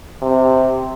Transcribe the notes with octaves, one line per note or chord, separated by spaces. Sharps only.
C3